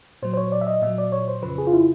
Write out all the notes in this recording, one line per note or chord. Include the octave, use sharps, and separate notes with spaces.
A#2 F#3 C5
C5
C#5
D5
E5
D#5
A#2 F#3 E5
D5
C#5
C5
F2 C#3 F3 B4
G#4
F4
E4